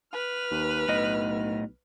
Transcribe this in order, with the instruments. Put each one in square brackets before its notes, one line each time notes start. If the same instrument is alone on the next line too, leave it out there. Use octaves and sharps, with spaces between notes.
[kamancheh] B4 F6
[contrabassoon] D#2
[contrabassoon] B1 [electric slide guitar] A2 D#5